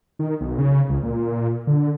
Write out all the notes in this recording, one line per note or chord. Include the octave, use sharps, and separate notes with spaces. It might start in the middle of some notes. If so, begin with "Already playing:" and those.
D#3
B1
C#3
C#2
A#2
D3